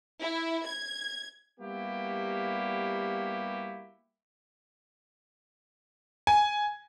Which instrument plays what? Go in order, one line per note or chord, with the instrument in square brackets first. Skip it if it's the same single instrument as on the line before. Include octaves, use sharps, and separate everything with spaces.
[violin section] E4
G#6
[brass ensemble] G3 A#3 B3 E4 F#4 G4
[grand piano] G#5